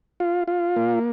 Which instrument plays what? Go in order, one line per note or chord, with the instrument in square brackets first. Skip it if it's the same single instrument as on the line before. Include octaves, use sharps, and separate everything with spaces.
[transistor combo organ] F4
F4
A#3